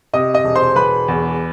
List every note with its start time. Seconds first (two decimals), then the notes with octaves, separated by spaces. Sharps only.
0.14 C3 D#5 D#6
0.34 D#5 D#6
0.45 E1
0.56 C5 C6
0.76 E1 B4 B5
1.08 E2